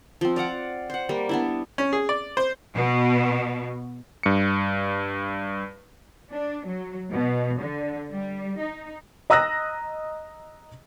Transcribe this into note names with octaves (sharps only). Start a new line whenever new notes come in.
F3 C4
D5 F5 F#5 D6
C5 F#5
G3 A#3
B3 D4 E4
C#4
G#4
D5
C5
B2
G2 C#7
D4
F#3
B2
D3
G3
D#4
D#5 A#5 D#6 E6 F#6 A#6